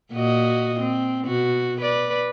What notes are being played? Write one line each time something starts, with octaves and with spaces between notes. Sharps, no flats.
A#2 F#4 D#5
C4
B2 F#4
B4 D5